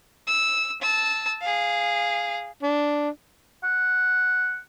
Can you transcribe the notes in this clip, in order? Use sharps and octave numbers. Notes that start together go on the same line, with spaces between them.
E6
A5 E6
G#4 F5
D4
F#5